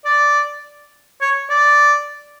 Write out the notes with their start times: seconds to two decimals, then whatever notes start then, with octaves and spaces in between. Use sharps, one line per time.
0.05 D5
1.21 C#5
1.50 D5